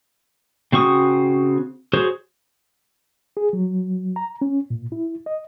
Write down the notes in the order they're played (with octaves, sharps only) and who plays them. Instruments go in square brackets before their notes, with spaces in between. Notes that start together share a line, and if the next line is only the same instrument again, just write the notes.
[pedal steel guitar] C#3 C4 F#4 C#6 D#6
F#4 G#4 C5 C#5
[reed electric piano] G#4
F#3
A#5
C#4
A#2
E4
D#5